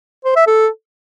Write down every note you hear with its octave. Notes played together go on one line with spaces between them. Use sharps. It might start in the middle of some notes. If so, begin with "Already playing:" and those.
C5
E5
A4